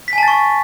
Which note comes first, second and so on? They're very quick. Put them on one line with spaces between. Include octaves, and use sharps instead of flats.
B6 G#5 A5 A6 C#6